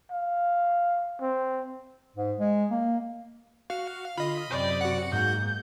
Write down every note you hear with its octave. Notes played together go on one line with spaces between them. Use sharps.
F5
C4
G#2
G#3
A#3
F#4 F5
D3 F4 D#5 B5
F#2 C3 D5 G5
F#4 F#5 C#7
G#2 A#3 G6